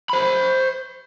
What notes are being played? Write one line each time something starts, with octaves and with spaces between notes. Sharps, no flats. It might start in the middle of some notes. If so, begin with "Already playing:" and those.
C5 B5